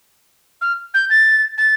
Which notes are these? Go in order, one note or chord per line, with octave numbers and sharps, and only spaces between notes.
F6
G6
A6
A6